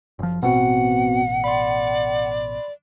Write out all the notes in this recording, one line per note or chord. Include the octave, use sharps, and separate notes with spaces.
F#1 F3
A1 B2 B3 C4 F#4 F#5
D5 B5 C6